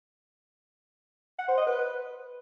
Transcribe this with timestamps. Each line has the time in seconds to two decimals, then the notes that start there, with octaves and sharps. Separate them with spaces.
1.39 F#5
1.48 C5
1.58 D#5
1.67 B4